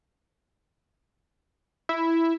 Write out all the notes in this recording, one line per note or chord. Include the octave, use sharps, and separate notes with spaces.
E4